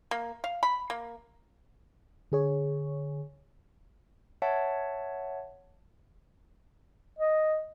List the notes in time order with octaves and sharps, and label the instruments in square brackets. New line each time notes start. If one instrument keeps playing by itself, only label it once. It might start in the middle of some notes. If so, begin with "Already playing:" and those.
[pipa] A#3
F5
B5
A#3
[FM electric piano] D3 G#4 C#5
[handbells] C#5 E5 F#5 A5
[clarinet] D#5